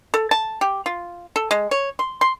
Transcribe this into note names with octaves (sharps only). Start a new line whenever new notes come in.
A4
A5
G4
F4
A4
G#3
C#5
C6
C6